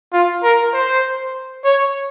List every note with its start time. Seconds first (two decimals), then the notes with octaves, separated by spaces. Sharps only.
0.12 F4
0.43 A#4
0.73 C5
1.65 C#5